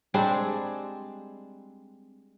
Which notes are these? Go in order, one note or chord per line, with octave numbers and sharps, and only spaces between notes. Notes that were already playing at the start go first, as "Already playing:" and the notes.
G3 G#3 C4 D4